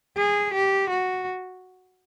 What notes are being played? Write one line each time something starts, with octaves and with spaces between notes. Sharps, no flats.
G#4
G4
F#4